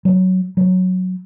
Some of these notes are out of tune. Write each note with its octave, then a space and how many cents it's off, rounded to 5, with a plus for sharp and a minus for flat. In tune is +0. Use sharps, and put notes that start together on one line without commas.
F#3 +5
F#3 -5